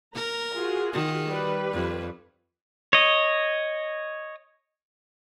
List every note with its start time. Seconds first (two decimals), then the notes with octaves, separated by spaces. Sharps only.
0.15 A#4 A#5
0.56 F4 F#4 G#4
0.93 D#3
1.27 G3 B4
1.75 F2
2.93 C#5 D#5